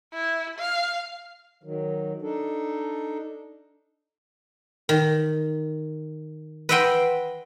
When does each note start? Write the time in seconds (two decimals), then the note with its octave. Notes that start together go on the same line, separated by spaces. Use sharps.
0.14 E4
0.58 F5
1.64 D#3 F#3
2.22 D4 D#4 A4
4.89 D#3
6.69 B4 D#5 E5 F#5 G5 C6